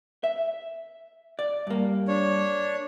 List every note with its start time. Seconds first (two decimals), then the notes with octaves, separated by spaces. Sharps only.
0.24 E5
1.39 D5
1.67 G2 A#3
2.08 D4 C#5